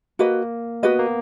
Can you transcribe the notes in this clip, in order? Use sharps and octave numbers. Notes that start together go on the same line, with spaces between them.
A#3 F#4 B4 D#5
B3 F#4 B4 D#5
A#3